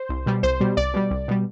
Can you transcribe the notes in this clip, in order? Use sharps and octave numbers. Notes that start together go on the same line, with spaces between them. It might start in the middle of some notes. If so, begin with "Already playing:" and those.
Already playing: C5
C2
B2 G3
C2 C5
B2 G3
C2 D5
B2 G3
C2
B2 G3